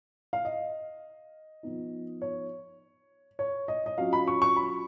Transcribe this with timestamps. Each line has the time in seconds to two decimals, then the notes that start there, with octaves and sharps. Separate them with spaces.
0.33 F5
0.45 D#5
1.63 F3 B3 D#4
2.22 C#5
3.39 C#5
3.68 D#5
3.86 D#5
3.98 F#3 C#4 F4 F5
4.13 B5
4.28 C#6
4.42 C#6
4.56 B5